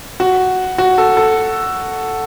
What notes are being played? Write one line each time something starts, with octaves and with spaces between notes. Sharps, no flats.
F#4
F#4
A4
A4